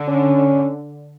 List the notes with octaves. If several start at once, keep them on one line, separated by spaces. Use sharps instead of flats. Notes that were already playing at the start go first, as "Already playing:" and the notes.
Already playing: D3
C#4